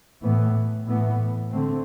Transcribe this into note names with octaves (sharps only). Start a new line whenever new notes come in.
A2 E3 B3
A2 E3 B3
D3 A3 C4